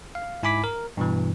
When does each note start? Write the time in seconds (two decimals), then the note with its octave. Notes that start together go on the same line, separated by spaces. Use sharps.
0.15 F5
0.43 G#2 E4 G#5 B5 D6 B6
0.64 A#4
0.97 G2 B2 E3